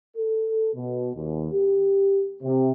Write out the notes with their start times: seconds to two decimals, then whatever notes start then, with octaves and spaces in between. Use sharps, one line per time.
0.16 A4
0.75 B2
1.15 D#2
1.51 G4
2.43 C3